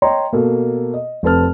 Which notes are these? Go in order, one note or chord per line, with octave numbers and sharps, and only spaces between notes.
C#5 D#5 G5 A#5 C6
B2 A#3 A4
D#5
F1 C4 A4 B4 A5 F6